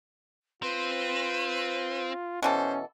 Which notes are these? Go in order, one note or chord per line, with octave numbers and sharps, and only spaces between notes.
C4 F4 B4
B2 E3 C#4 A4 C5